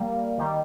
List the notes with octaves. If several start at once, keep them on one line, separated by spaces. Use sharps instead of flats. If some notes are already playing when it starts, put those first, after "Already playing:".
Already playing: G3 A#3
D#3 G3